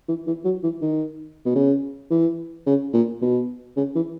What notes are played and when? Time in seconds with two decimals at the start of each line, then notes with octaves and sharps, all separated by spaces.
0.08 E3
0.27 E3
0.45 F#3
0.63 E3
0.82 D#3
1.46 B2
1.55 C#3
2.10 E3
2.66 C#3
2.93 A#2
3.22 B2
3.77 C#3
3.95 E3